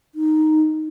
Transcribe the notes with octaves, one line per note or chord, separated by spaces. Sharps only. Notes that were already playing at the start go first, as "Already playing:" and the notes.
D#4